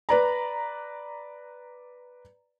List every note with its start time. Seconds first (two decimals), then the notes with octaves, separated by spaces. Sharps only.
0.09 B4 D5 A#5